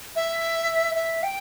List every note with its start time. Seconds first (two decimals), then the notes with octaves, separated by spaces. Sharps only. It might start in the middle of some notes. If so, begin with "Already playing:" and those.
0.16 E5
0.95 E5
1.23 G5